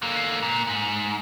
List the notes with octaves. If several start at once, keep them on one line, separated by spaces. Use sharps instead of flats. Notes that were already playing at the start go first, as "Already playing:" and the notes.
D3 A#3
A#2
G#2